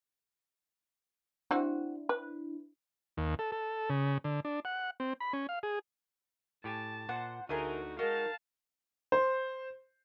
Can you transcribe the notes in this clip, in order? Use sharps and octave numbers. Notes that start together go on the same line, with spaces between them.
C4 D4 E4 F#4 F#5
B4
D#2
A4
A4
C#3
D3
D4
F#5
C4
B5
C#4
F5
G#4
A2 G4 G#5 A5
A#2 C5 F#5
D2 A3 D#4 E4 F#4 G#4 A#4 D#5
G#3 D#4 F#4 A#4 F5 A5
C5